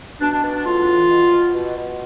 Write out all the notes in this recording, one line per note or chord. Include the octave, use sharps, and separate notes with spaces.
B2 D4
D4
B2 D4
D4
A2 F4
E3
B2
B2
B2
B2